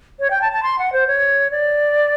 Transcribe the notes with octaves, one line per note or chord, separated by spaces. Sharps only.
C#5
G5
A5
A5
C6
F#5
C5
C#5
D5